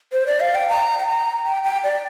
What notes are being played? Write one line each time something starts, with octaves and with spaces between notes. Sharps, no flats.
C5
D5
F5
G5
A#5
G5
A#5
G5
G5
D5